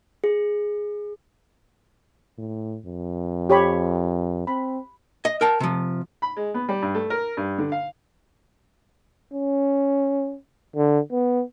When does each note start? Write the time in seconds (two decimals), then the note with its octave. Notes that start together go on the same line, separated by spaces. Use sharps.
0.24 G#4
2.38 A2
2.86 F2
3.50 G4 C#5 B5
4.47 C4 B5
5.25 D#5
5.41 A#4 G5 A5
5.60 C3 F3
6.22 B5
6.37 G#3
6.54 B3
6.69 G3
6.82 G2
6.95 A3
7.10 A#4
7.37 G2
7.58 D3
7.72 F5
9.33 C#4
10.76 D3
11.12 B3